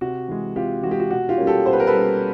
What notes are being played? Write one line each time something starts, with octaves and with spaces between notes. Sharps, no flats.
C3 F#4
E3 G#3
C3 F4 G4
E3 G#3 F#4 G4
F#4
B2 F#4
F4 G4
G3 A#3 C#4
G4 A4
B2 C5
B4
A#4
A4 B4
G3 A#3 C#4